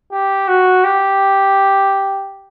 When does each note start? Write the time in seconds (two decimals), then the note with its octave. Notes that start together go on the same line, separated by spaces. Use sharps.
0.12 G4
0.48 F#4
0.84 G4